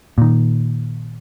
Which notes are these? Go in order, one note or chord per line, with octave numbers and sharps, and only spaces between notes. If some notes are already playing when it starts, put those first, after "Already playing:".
A#2 D#3